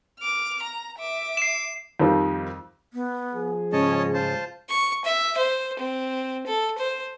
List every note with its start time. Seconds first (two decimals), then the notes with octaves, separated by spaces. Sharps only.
0.20 D6 F6
0.63 A#5
0.98 E5 D6
1.37 C7 E7
1.99 F2 D#3 F3 G3
2.93 B3
3.34 F3 G#4
3.73 G#2 C#3 G#3 C#4 C#5 D#5 A5
4.14 F4 C5 A5
4.69 C#6
5.04 E5
5.37 C5
5.79 C4
6.47 A4
6.78 C5